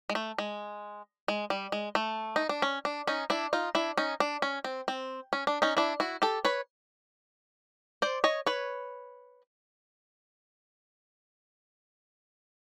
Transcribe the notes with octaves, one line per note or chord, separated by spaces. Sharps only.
G#3
A3
G#3
G#3
G3
G#3
A3
D#4
D4
C#4
D4
C#4 D#4
D4 E4
D#4 F4
D4 E4
C#4 D#4
D4
C#4
C4
C4
C#4
D4
C#4 D#4
D4 E4
E4 F#4
G4 A4
B4 C#5
C5 D5
C#5 D#5
B4 C#5